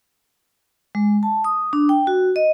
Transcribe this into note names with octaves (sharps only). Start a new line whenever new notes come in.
G#3
A5
D#6
D4
G5
F#4
D#5